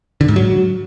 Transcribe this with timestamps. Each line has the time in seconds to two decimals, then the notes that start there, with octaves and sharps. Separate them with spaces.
0.21 D3
0.28 G#2
0.36 F#3